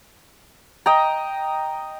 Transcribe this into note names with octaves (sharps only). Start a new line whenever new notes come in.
D#5 G5 A#5